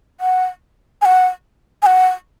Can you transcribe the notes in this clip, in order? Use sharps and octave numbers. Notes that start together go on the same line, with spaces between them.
F#5
G#5
F#5
G#5
F#5